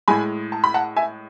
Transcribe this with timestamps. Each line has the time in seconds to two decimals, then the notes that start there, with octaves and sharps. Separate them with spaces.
0.08 A2 G#3 G#5 B5
0.52 A5
0.64 B5
0.74 F#5 A5
0.96 E5 G#5